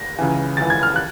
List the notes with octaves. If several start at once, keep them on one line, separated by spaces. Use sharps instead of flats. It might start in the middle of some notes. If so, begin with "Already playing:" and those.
Already playing: A#6
C#2 C#3 E3
C#2 C#3 E3 A6
G#6
F6
F#6